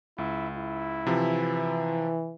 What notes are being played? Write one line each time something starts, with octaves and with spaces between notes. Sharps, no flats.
C#2 E4
E4
C3 E3 F3